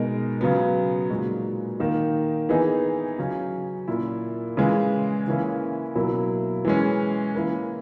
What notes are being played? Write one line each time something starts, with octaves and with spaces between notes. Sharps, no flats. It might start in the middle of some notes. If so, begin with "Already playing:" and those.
Already playing: B2 G#3 D#4 A#4
C#3 F#3 B3
A#2 G#3 D#4 F#4
D#3 A#3 D#4
E3 B3 D#4 G#4
C#3 F#3 C#4
A#2 A#3 E4
C#3 E3 G#3
C#3 E3 A#3 C#4 E4
B2 F#3 A#3 E4 A#4
E3 G#3 C#4
E3 A#3 E4 A#4